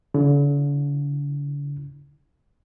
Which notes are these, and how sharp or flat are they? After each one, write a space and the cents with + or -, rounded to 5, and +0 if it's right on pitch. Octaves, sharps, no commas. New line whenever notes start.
D3 -45 E4 -5